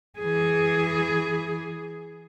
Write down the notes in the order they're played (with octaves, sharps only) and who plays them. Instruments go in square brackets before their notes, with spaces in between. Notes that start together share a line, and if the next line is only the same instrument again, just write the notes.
[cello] E3 G#4